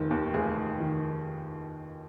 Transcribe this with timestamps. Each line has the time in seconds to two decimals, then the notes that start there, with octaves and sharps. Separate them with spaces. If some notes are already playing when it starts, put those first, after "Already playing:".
Already playing: F1 D#3
0.11 D#2
0.34 F1 G#4
0.57 F1
0.80 D#3